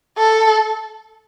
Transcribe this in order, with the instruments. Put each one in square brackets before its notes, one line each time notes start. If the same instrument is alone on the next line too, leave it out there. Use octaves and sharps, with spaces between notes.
[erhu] A4